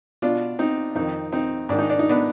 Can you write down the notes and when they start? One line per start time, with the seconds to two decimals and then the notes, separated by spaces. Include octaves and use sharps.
0.22 B2 D4 F4
0.59 C4 D#4
0.95 F2 D#3 C4 D#4
1.32 C4 D#4
1.69 G#2 D#3 D4
1.79 D#4
1.89 D4
1.99 D#4
2.09 B3 D4